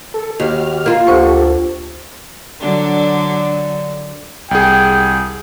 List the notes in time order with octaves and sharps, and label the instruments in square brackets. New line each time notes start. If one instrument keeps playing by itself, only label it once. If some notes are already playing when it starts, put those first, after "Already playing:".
[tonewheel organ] A4
[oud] D#2 [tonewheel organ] F#4 G4 F6
[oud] A#3 F4
[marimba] D2 C5 C#6 [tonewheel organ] G4 A4
[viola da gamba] D3 F#3 D4
[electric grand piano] C2 G#4 [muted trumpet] G5